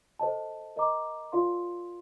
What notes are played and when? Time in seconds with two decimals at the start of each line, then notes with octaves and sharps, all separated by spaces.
0.19 A4 C5 D#5 A5
0.76 A#4 D#5 A#5 D6
1.32 F4 A#4 D5 F5 C6